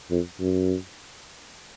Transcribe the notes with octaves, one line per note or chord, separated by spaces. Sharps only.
F2
F#2